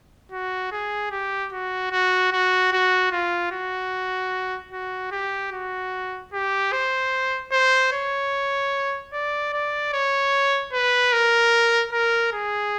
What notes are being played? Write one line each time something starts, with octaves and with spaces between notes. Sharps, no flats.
F#4
G#4
G4
F#4
F#4
F#4
F#4
F4
F#4
F#4
G4
F#4
G4
C5
C5
C#5
D5
D5
C#5
B4
A#4
A#4
G#4